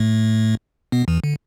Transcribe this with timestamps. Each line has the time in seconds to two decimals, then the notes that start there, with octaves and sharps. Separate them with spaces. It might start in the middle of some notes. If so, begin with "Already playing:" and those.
Already playing: A2 A3
0.92 B2 B3
1.08 E2 E3
1.24 D3